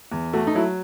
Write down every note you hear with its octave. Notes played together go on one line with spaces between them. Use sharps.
E2
A3 F#4
D#4
F#3 E4